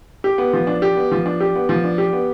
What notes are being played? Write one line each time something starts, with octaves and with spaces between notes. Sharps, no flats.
G4
B3
F3
D4
G4
B3
F3
D4
G4
B3
F3
D4
G4
B3